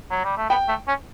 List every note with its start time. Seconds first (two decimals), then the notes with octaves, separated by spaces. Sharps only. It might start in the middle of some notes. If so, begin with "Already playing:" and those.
0.11 F#3
0.24 G3
0.37 A3
0.50 B3 G5
0.68 A3
0.88 C#4